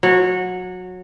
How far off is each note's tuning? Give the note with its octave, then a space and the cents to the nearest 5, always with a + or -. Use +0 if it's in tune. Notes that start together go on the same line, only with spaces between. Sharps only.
F#3 -20